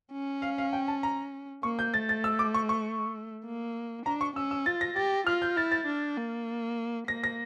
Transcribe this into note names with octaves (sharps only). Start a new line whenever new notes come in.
C#4
F5
F5
G5
A5
A#5
A#3 C#6
G6
A3 A6
A6
E6
D6
C#6
C#6
A#3
D4 A#5
C#6
C#4 E6
E6
F4 A6
A#6
G4 A6
F4 F6
G6
E4 A6
A6
D4
A#3
A#3 A#6
A#6